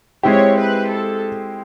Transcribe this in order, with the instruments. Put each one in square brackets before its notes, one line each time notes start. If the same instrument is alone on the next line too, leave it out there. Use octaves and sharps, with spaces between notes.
[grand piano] G#3 C4 E4 G4 [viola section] C#5
[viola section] B4
A4